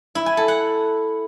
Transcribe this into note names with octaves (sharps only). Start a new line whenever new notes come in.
E4
G#5
A4
F#5